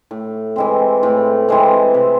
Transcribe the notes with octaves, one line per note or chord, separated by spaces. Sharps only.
A2
E3 G#3 C4
A2
E3 G#3 C4
C3